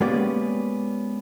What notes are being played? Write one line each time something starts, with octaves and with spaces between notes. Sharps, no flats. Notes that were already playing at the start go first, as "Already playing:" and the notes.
G#3 A#3 B3 C#4 G4 D5